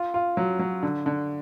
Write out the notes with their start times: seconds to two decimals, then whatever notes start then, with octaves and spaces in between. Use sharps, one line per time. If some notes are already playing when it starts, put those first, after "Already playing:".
Already playing: F4
0.14 F4
0.37 F#3
0.59 F#3
0.83 D3
1.06 D3